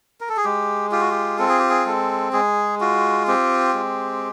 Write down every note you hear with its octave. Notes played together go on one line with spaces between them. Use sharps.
A#4
A4
G#4
G#3 G4
F4 G4
F#4
G4
C4 A4
G#4
G4
G#4
G#3 A4
G#3 G#4
F4 F#4
C4 G4
G#3